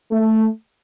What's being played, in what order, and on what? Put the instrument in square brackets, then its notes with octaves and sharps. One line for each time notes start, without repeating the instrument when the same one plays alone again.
[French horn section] A3